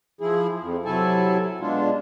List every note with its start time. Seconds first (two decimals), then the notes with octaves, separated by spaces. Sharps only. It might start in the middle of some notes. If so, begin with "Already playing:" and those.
0.21 F3 E4 G#4
0.62 F2
0.85 C3 F#3 E4 A4 G#5 A5
1.61 B2 G#3 D4 F4